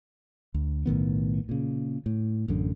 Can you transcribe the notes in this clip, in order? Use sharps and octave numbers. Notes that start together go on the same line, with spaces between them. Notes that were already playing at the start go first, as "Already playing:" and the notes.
D2
B1 A2 D#3 B3
A#2 C#3
A2
A1 F#2 D3